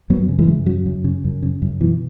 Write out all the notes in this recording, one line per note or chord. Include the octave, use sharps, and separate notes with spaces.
F#2 F#3 B3
C#3
E3 G#3
F#2
C#3 F#3
F#2
C#3
F#2
C#3
F#2
B2 E3